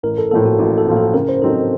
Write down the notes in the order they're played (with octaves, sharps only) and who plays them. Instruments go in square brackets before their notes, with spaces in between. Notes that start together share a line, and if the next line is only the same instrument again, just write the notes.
[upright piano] A1 [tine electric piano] A#4
[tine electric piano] A4
[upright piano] A2 F3 A#3 [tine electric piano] A4
[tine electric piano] F#4
[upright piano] A1 [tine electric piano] F#4
[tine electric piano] A4
[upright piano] A2 F3 A#3
[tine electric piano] A4
[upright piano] C#3 [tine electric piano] A#4
[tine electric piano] C5
[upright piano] F#3 C4 D#4 [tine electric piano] A4